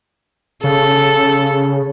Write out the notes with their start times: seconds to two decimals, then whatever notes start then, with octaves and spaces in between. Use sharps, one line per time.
0.64 C#3 A4